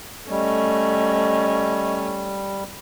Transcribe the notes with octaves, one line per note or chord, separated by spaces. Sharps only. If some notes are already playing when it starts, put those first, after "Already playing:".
G3 A3 C#4 D#5